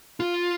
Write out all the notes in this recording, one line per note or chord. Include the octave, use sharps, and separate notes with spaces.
F4